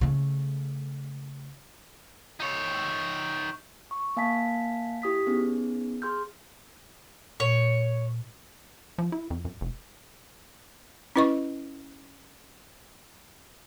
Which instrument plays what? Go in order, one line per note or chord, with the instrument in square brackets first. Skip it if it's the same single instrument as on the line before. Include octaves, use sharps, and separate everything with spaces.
[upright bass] C#3 A3
[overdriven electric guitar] D#4 C#5
[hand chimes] C#6
A#3 F5 G#5 A5 B6
E4 G4 D#6 B6
B3 C#4 D#4 G#4
G#4 C6 F6 G6
[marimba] A#2 [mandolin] C#5
[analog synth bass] F3
E4
F2
F#2
F1
[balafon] C#4 E4 B4 D#5 C#6